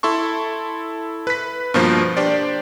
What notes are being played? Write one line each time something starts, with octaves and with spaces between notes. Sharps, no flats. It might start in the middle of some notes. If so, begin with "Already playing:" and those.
E4 A4 C6 C#6
B4 B6
G2 B2 F3 A#3 C5
D4 G4 C5 D5